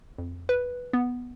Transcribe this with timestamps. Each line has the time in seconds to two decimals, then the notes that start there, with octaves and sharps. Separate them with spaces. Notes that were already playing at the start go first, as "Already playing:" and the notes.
0.18 F2
0.49 B4
0.93 B3